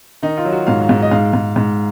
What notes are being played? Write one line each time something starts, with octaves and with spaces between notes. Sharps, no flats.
D#3 D#4
F4
F#3
F#4
G#2 F5
F5
G#2
D#5
G#2 F5
G#2
G#2